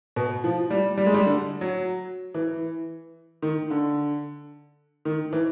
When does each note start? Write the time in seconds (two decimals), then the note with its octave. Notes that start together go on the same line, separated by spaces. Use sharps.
0.16 B2
0.44 F3
0.70 G3
0.97 G3
1.06 G#3
1.14 G3
1.26 D3
1.61 F#3
2.34 E3
3.42 D#3
3.70 D3
5.05 D#3
5.33 E3